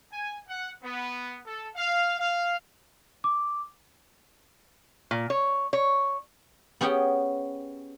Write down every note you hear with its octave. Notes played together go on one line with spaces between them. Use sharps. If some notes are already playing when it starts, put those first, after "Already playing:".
G#5
F#5
B3
A4
F5
F5
D6
A#2
C#5
C#5
B3 C#4 G4 G#4 F#5 G5